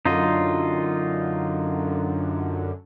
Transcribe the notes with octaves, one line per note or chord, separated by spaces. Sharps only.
F#2 D3 D#4 F4 D#5